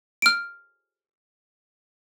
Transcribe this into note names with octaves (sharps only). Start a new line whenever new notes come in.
F6 D7